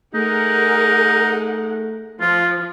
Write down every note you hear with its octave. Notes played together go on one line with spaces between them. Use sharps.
A3 D#4 G#4 A#4 F#5
F3 F4